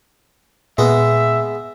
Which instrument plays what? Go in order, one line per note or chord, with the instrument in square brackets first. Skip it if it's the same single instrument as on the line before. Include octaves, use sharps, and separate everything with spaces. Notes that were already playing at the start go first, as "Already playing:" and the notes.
[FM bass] A#2 [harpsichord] G#3 B3 [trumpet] E5